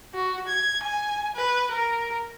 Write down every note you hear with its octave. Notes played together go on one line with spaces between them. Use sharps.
F#4
G#6
G#5
B4
A#4